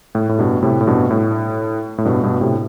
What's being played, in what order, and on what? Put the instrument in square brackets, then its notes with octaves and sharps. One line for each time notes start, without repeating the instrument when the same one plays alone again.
[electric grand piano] A2
A2
G2 B2
A2 C3
A2
G2 B2
A2
A2
G2 B2
G2 B2
A2 C3